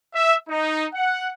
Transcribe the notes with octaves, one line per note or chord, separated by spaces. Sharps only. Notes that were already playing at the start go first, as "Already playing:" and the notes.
E5
D#4
F#5